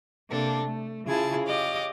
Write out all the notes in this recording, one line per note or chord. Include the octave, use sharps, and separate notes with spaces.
C3 A#3 D4 A4
A3
C#3 E4 F4 G#4 A5 G#6
G4 C#5 D#5 F5 D6